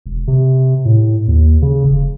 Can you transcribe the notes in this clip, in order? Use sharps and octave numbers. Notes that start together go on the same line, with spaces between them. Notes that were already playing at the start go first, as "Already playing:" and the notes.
E1
C3
A2
D#2
C#3
F1